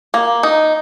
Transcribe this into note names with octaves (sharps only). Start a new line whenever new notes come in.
A#3
D#4